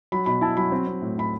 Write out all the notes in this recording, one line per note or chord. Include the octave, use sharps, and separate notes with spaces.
F#3 B5
B2 B5
E4 A5
F#3 B5
C4
C4
A2
A2 B5